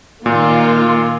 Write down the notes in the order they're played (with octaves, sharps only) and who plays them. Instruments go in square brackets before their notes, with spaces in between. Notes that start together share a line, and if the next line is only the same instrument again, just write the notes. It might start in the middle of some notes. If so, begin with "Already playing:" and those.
[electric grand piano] A#2 [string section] D#3 A#3 F4